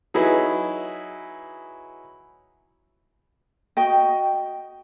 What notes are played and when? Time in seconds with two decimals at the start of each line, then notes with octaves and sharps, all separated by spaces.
0.14 F#3 D#4 E4 G#4 B4
3.77 F#4 D#5 G5